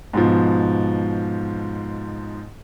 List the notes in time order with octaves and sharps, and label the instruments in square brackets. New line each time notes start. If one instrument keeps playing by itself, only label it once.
[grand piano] G#2 B2 F3